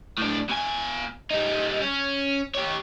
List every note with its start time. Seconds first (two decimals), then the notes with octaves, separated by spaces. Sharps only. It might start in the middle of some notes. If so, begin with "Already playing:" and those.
0.18 A2 D4
0.49 B2 G#5
1.31 G3 D#4
1.82 C#4
2.55 G4 C#5